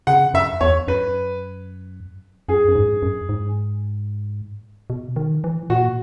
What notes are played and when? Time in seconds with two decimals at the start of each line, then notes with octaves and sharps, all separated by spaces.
0.07 C#3 F#5
0.34 F#2 E5
0.61 E2 C#5
0.87 F#2 B4
2.49 F#2 G#4
2.68 F#2
2.75 G#2
3.02 F#2
3.29 G#2
4.90 B2
5.16 D#3
5.44 E3
5.70 A#2 F#4